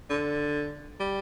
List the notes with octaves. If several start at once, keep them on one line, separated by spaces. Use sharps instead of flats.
D3
G3